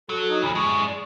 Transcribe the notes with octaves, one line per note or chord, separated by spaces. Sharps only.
F#3 A4
D#4
D2 F3 B5
F#2 G#3 C#6
D5